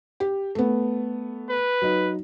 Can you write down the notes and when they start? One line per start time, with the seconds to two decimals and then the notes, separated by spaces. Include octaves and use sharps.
0.20 G4
0.55 A3 B3
1.50 B4
1.82 F#3 D#4